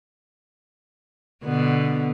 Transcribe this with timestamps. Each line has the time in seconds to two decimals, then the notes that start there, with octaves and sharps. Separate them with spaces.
1.44 B2 D3 B3